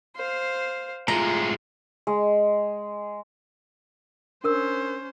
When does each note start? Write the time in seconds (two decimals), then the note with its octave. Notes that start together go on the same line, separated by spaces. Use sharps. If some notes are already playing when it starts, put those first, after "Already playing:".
0.16 C5 F5
1.08 A2 G#3 F4 A#5
2.07 G#3
4.44 C#4 D4 A#4 C5 E6